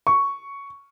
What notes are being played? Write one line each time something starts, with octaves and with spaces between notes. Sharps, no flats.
C#6